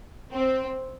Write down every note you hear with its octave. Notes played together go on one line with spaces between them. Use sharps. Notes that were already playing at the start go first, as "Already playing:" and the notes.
C4